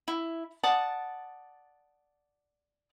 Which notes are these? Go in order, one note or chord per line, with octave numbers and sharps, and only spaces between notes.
E4
D5 F#5 A5 D#6